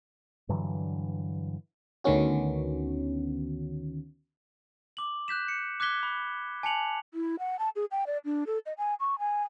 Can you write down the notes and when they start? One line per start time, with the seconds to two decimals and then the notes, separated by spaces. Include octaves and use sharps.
0.49 G2 D3 E3 F#3
2.04 D2 D3 D#3 B3 C#4 F#4
4.97 D6 F#7
5.28 F#6 G6 B6 E7
5.48 C#7
5.80 D6 F#6 G#6 B6 G7
6.03 B5
6.63 G#5 A5 C#7 F7 F#7
7.14 E4
7.39 F#5
7.59 A5
7.76 G#4
7.91 G5
8.07 D5
8.25 D4
8.47 A4
8.66 D#5
8.78 G#5
9.00 C#6
9.19 G#5